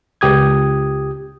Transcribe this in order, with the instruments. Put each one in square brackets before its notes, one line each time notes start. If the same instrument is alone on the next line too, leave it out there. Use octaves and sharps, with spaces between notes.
[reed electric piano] C#2 G4 D#6 G#6